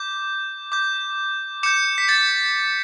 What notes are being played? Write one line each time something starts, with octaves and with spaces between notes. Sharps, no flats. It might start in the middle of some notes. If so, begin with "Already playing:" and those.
Already playing: D6 G6
D6 G6
D6 G6 C#7 E7
B6
A6 C#7